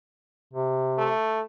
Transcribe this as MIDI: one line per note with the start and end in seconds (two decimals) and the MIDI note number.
0.53 1.11 48
0.98 1.41 57